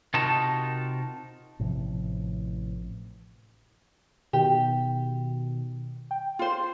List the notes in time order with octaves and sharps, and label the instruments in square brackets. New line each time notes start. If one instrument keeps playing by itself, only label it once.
[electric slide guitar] C3 D#4 F4 F#4 A#4 A5
[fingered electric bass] A1 A2 C3 F3
[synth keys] B2 D#3 [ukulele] G4
[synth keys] G5
[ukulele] F4 C5